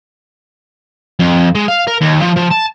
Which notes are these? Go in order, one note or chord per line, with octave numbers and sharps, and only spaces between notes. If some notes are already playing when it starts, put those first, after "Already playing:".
F2
G#3
F5
A#4
D#2
F3
F3
A5